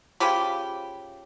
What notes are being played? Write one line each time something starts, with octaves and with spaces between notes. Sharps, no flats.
C#3 F3 G4 B5